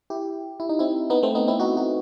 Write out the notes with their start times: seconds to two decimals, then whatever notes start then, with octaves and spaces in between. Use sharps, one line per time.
0.10 E4 G4
0.60 E4
0.69 D#4
0.79 C4 E4
1.10 B3 D#4
1.23 A3 C4
1.35 B3 D#4
1.47 C4 E4
1.60 D#4 F#4
1.77 D#4 F#4